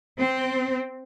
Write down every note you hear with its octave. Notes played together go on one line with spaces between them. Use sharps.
C4